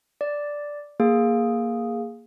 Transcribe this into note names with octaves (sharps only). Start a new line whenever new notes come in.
D5
A#3 G#4